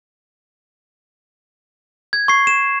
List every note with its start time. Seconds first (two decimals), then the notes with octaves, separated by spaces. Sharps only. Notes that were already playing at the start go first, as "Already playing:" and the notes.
2.13 G#6
2.28 C#6 C7
2.47 E7